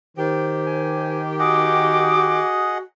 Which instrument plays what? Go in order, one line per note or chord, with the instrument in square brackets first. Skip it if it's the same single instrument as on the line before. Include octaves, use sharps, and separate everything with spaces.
[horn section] D#3 G4 [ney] C5
[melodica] G#5
[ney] F#4 [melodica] G#4 D#5 F#5 [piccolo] D6